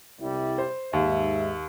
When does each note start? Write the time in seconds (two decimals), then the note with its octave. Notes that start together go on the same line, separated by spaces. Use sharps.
0.20 C2 G3 E4
0.58 C5
0.93 D#2 G#2 G#3 E5